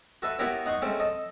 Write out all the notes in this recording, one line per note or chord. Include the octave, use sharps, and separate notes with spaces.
F#4 A4 B4 E5
B3 E4 F#4 G4 A#4 C#5
D#4 F#5 C6 C#6
G#3 A3 C4 C#4
A4 D#5